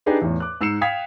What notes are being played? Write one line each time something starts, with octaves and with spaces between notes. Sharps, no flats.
D4 D#4 G4 G#4 B4 D#5
E2 A2
D6 F#6
G#2 E6 C7 C#7 E7
F5 G5 D#6 G#6 B6 F7